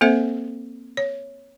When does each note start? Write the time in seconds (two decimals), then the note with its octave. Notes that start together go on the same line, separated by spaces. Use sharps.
0.01 A#3 C4 A4 C5 E5
0.97 C#5